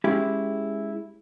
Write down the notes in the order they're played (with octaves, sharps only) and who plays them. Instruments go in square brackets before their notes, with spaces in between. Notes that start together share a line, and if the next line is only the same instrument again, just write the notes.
[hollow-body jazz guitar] G#3 C#4 E4 G4 G#4